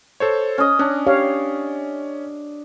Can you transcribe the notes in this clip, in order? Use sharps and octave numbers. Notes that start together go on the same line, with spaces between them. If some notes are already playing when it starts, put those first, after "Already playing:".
A4 C5 C#5
C#4 D#5
C#4 D4
G4 C#5 F5